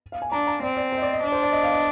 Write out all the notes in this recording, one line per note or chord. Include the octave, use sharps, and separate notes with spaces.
F5
G#5
D4 A#5
A#5
C4 D5
D5
C5
D#5
D5
D#5
D4
C5
D5
D#5
F5
D#5